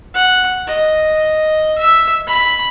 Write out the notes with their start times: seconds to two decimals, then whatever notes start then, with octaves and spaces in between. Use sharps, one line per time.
0.14 F#5
0.67 D#5
1.78 E5
2.27 B5